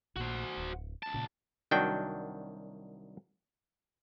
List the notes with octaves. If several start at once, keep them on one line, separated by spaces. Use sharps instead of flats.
A#1 A#2 F#4 C5
D1
C#2 A5
A#2 C#3
C2 D#3 F#3 D4 F#4 G5